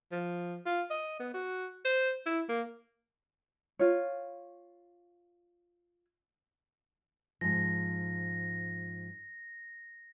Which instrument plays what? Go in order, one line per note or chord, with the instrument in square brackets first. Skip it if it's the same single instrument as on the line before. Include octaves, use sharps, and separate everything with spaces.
[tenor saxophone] F3
F4
D#5
B3
F#4
C5
E4
A#3
[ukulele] F4 C#5
[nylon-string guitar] G#2 F3 [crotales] A#6